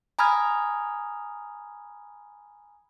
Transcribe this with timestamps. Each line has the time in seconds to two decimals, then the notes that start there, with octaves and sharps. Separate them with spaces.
0.19 G#5 A#5 B5 D#6 F6 G#6